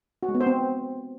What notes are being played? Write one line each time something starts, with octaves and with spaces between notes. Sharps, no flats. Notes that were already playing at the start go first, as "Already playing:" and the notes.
F#4
G#3
B3
C5
C4